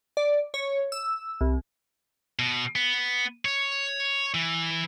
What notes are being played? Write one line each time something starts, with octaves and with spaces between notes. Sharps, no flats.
D5
C#5
E6
C2
B2
B3
C#5
E3